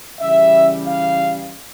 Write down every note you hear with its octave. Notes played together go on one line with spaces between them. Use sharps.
C#3 E3 G3 E5
F5